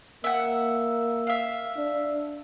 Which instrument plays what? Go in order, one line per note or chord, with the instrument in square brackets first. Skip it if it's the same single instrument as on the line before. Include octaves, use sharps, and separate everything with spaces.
[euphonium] A#3 [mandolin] E5 F#5
[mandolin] E5 F5
[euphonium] D4